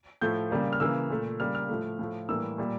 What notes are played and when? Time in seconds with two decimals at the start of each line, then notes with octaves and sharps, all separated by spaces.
0.21 A2 F3 A3 G6
0.51 C#3 G3 A#3
0.73 F6
0.80 C#3 E3 A#3 E6
1.10 A#2 A3
1.40 C#3 G3 A#3 F6
1.55 F6
1.69 A2 F3 A3
1.99 A2 F3 A3
2.29 A2 E3 G3 A#3 E6
2.58 A#2 G3 A#3